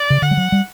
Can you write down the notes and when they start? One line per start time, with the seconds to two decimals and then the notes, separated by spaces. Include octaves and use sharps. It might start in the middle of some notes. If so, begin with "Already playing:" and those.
Already playing: D5
0.10 C#3
0.22 D3 F#5
0.31 G3
0.37 F#3
0.52 G3